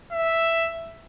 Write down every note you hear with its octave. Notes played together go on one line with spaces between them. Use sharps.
E5